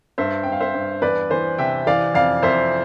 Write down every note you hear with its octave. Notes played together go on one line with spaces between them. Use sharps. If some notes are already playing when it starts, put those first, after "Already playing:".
G2 C5 E5
G2 G5
F5
C5 E5
G2
E2 B4 D5
E3 C5
C3 E5 G5
E3 D5 F5
F2 D5 F5
F2 C5 E5